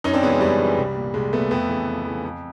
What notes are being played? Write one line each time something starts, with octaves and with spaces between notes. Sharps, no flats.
F#2 C#4 D#4
C4 D4
C#3 E3 G#3 B3 C#4
F#2 G3
C#3 E3
C2
A#2
C2 G#3
A#2 A3 B3
F2 A3 B3
C#3 E3
F2
C#3 E3
F2